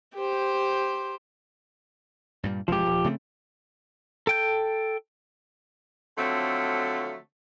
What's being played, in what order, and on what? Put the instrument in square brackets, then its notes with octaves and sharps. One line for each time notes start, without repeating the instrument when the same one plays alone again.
[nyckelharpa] G4 C5
[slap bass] G2 A#2 G3
[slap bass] E1 F#2 G#3 [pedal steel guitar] F3 G4
[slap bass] D#1
C#3 A3 C4
[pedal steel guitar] A4 G5 G6
[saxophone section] D3 F3 F#3 A3 C4